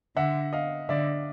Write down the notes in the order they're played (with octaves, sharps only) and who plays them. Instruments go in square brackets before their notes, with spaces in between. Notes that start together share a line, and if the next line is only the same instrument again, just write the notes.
[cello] D3 [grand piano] E5 F#5
[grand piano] D#5 F5
[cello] D3 [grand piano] D5 E5